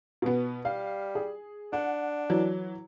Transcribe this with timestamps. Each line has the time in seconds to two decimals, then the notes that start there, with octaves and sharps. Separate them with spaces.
0.22 B2 B3
0.65 G3 F5
1.15 G#4
1.73 D4 F#5
2.30 E3 F#3